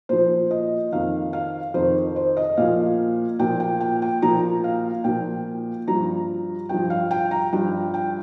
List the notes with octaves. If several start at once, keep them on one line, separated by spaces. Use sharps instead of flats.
A#2 F3 C5
D#5
F2 D#3 F5
F5
F2 D#3 C5
C5
D#5
A#2 F3 F5
A#2 F3 G5
G5
G5
G5
A#2 F3 A#5
F5
A#2 F3 G5
G2 F3 A#5
G2 F3 G5
F5
G5
A#5
G2 F3 G5
G5